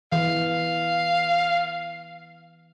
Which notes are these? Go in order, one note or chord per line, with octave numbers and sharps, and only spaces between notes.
E3 F5